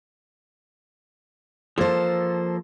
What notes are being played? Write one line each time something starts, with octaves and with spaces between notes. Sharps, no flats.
F3 A#3 A4 C5